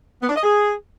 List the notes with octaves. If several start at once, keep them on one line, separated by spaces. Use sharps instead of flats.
B3
D4
D#5
G#4